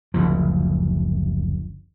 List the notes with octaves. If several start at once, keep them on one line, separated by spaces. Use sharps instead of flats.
F#1 D2 F3